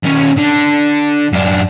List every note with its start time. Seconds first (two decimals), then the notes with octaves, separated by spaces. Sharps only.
0.03 D#2 C#4
0.37 D3
1.33 F#2 D4